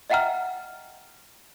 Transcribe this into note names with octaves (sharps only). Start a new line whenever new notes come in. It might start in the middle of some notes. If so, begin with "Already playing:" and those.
D#5 E5 F#5 G5 A#5 F6